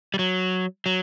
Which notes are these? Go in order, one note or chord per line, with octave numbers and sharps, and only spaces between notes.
G3
F#3
F#3